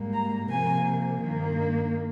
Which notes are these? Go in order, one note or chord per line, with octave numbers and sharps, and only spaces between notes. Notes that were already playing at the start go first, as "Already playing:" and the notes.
Already playing: G#2 G3 A#3
A#5
C3 F3 A#3 G#5
G2 D#3 A#3